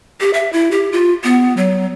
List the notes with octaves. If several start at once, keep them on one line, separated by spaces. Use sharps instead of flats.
G4
E5
E4
G4
F4
B3
F#3